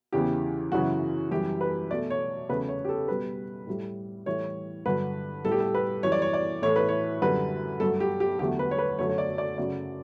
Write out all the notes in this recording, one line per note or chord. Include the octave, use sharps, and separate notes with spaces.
E2 C#3 E3 G4
F#2 C#3 E3 F#4
F#2 E3 G3 G4
B4
B2 A3 D5
C#5
E2 C#3 F#3 A3 B4
C#5
G4
A4
B2 G3 B4
A2 G3
A2 E3 G3 C#5
G2 D3 F#3 B4
A2 G3 A4
G4
A4
B4
F#2 E3 G3 C#5
D5
C#5
D5
A2 E3 A3 C#5
B4
C#5
F#2 D3 G3 B4
G2 F#3 A3 A4
G4
G4
E2 D3 F#3 A3 G4
B4
C#5
B4
F#2 D3 A3 C#5
C#5
D5
D5
F#2 C#3 F#3 A3 D5